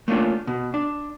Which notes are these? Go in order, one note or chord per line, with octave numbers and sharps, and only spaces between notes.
A3 A#3 C#4 D4 F4 D5
B2
D4